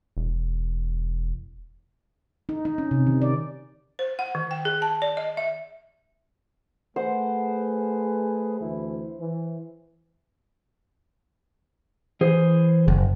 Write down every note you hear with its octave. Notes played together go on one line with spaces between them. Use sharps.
E1
D#4
D#4
C#4
C3
D#3
D5
C5
F#5
D#3
G5
G#4
A5
D5
D#5
E5
A3 G#4 B4 C5 F#5
D2 E3 E4
E3
E3 G#4 C5
F#1